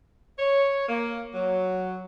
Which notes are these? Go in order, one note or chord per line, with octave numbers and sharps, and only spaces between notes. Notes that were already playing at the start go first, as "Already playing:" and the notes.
C#5
A#3
F#3